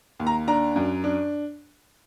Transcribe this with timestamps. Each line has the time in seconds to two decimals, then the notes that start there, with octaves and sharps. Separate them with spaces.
0.20 D#2
0.27 A#5
0.48 D4 A#5
0.76 F#2
1.04 D4